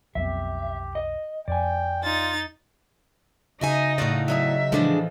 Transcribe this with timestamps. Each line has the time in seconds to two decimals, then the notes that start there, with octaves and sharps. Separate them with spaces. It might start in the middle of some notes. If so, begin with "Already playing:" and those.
0.15 B1 F2 B3 G4 E5
0.95 D#5
1.48 F2 D5 G5 G#5
2.03 D#4 F4 A6
3.61 C#3 D#4 F#4 D#5 E5 G#5
3.98 A2 F4 F#4 D5 E5
4.28 F#3 D#4 G#4 E5
4.72 A2 E3 F3 G#3 D4 G#4